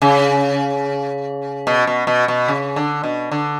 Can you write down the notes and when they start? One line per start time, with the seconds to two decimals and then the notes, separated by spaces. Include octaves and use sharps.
0.02 C#3
1.67 B2
1.87 B2
2.07 B2
2.28 B2
2.48 C#3
2.76 D3
3.04 B2
3.31 D3